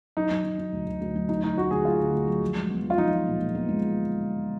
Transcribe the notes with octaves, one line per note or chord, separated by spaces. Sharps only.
F#3 D#4
F#3
F#3
F#3
D2
D2
D2
F#3
F#3 D#4
D2 D#4
D2 F#4
D2 G#4
F#3 F4
D3
D2
F#3
F3
G#3
B3
F3
F4
F3 D#4
F3
A#2
A#2
B3
G#3